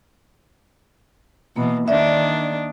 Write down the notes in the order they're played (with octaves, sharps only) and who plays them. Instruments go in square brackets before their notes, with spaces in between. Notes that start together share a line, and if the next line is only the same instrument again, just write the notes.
[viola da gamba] B2 E3 [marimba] A#3
[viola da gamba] D#3 D4 [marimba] D5 E5